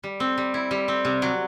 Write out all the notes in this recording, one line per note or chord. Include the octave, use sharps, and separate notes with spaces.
G3
C4
G3
E4
G3
C4
C3
F#3